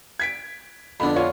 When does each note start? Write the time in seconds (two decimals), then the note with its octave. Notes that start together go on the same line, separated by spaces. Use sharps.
0.20 G#6 B6 D7
1.00 F2 D3 B3 D4 B5
1.16 F4 C#5